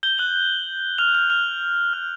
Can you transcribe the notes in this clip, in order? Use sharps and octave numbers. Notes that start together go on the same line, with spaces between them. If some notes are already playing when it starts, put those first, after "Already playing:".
G6 G7
F#6 F#7
F6 F7
F6 F7
F6 F7
F6 F7